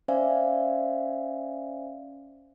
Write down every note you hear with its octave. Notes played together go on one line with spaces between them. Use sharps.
C#4 C5 D5 E5 F5 G#5